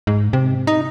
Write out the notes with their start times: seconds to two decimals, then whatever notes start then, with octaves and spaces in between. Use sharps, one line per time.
0.07 G#2
0.33 C3
0.67 D#4